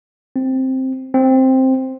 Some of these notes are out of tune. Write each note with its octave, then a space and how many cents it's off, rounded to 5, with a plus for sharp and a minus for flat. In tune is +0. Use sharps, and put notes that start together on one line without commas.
C4 +5
C4 +5